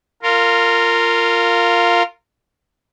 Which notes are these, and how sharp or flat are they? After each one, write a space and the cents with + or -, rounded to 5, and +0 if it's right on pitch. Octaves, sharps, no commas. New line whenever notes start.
F4 +0 A#4 -20